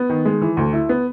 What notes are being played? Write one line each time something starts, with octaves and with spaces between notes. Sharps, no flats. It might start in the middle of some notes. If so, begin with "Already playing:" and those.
Already playing: B3
D#3
G#3
E3
D2
E4
B3